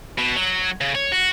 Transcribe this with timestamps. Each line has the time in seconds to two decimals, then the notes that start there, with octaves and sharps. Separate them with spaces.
0.18 B2
0.37 F#3
0.81 C#3
0.95 C#5
1.12 F#4